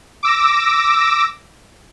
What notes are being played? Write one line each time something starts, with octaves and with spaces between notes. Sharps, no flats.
D6 E6 A#6